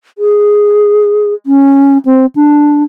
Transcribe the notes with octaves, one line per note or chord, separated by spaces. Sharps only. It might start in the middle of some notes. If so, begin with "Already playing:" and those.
G#4
C#4
C4
D4